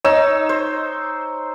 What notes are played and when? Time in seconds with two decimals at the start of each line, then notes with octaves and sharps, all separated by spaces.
0.04 D#4 C#5 E6
0.49 C5